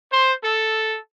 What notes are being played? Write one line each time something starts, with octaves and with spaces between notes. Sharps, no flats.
C5
A4